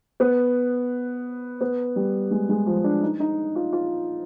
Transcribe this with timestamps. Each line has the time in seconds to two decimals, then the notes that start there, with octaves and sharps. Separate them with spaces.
0.20 B3
1.61 B3
1.96 G3
2.31 G#3
2.49 G#3
2.66 F3
2.84 D4
3.03 D#4
3.20 D#4
3.56 F4
3.73 F4